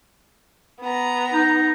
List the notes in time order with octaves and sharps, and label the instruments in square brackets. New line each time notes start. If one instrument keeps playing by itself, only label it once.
[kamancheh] B3 A#5
[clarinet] D#4